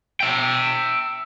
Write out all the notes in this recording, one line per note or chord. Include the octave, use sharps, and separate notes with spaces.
E5 G5